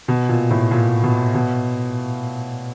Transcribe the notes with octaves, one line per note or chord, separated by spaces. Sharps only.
B2
A#2
A2
A#2
B2
B2